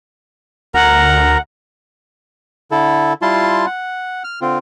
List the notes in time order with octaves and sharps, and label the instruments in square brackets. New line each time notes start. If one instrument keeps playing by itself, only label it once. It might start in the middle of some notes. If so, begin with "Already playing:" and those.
[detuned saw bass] D2 [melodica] A#4 A#5 [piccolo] F#5
[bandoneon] D3 E4 A4
G3 E4 F4 A5 C6
F#5
F6
D3 C4 F4